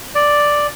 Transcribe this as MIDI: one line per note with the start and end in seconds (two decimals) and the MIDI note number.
0.15 0.67 74